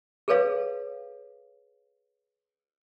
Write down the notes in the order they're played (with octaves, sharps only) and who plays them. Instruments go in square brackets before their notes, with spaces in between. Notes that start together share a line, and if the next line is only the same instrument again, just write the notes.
[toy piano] G#4 A4 B4 C#5 F5